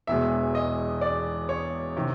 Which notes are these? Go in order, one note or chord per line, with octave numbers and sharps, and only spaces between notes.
E1 E2 B2 G#3 E5
D#5
D5
C#5
C3 D#3